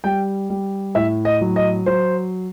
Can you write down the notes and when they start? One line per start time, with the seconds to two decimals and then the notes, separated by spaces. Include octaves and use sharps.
0.04 G3 G5
0.50 G3
0.95 A2 E5
1.25 D#5
1.41 F#3
1.56 D#5
1.86 F#3 C5